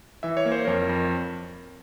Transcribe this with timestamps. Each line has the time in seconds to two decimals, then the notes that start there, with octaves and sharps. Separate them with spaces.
0.23 E3 E5
0.37 C#5
0.45 A#3
0.52 C5
0.65 F2 A#4 C#5
0.89 F2